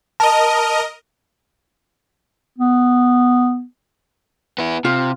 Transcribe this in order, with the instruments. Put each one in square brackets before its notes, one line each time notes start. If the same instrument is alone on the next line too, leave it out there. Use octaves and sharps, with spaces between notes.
[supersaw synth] A#4 D#5 [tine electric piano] A5
[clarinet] B3
[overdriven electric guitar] B3 E4
[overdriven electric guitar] C3 [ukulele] F4